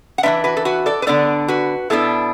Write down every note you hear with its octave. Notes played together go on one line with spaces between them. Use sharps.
F#5
E3 A3 D4 B4 E5
F#4 B4
A4
F#4 B4
A4 D5
B4
D3 B3 D4 A4 D5
F#4 B4
B2 B3 D4 E4 A4